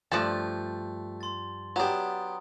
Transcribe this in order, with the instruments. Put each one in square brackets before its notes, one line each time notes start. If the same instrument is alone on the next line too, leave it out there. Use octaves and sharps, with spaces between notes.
[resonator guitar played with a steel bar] G2 F3 [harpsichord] A3 [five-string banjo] D5 A5
[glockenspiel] C6 A6
[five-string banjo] F#3 D4 [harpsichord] B3 G4 [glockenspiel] A#5 D#6